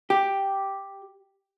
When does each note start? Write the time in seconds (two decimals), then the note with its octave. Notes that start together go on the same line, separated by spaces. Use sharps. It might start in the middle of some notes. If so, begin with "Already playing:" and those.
0.10 G4